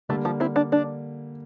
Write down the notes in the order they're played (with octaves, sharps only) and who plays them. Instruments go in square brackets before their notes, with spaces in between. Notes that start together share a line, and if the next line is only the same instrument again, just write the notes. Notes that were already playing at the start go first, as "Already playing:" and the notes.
[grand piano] D3 G3 A#3 [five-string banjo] A3
[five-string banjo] F3
C4 E4
D4
D4